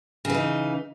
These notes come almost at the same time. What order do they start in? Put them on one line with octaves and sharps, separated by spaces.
C#3 E3 D#4